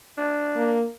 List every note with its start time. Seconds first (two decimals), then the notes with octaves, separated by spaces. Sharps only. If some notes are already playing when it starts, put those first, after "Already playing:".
0.18 D4
0.56 A#3